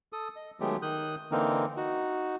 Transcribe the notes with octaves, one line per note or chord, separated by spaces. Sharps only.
A4 D#6
D#5
D#3 F#3 G#3 A3 B3 G4
D#3 D#6 F#6 G6
D3 E3 A#3 C4 D#4 A#4
D#4 F#4